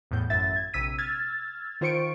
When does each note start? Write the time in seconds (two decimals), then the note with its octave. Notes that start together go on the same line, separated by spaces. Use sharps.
0.11 E2 A2 G6
0.30 A1 F#2 E5 A6
0.56 G#6
0.74 A#1 C3 E6 B6 D#7
0.98 E6 F6 G#6 A6
1.81 D#3 F4 C5 C#6 C#7 D7